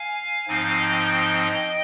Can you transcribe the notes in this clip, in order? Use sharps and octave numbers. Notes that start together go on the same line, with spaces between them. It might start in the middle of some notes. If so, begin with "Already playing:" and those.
Already playing: F5 G#5
G#2 F3 C4 D#4 F5 G#5
D#5 G5